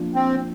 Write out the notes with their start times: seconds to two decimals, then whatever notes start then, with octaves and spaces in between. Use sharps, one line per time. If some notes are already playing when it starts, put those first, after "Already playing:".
Already playing: F3 A#3 D4 F4
0.15 C4